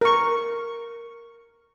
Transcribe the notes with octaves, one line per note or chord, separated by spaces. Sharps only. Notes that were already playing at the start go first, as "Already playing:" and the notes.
A#4 C#6